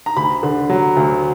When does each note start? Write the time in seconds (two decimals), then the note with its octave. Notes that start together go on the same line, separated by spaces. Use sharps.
0.06 A#5
0.16 D2 B5
0.43 D3
0.70 F#3
0.96 D2